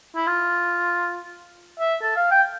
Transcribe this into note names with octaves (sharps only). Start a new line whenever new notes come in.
E4
F4
E5
A4
F5
G5